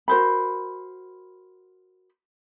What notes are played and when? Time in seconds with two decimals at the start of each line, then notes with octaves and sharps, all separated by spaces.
0.08 F#4 A#4 C5 B5